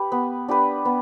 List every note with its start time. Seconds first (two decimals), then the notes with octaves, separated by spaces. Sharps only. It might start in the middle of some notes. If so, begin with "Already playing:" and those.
Already playing: G4 B4
0.12 B3
0.48 D4 G4 B4
0.85 B3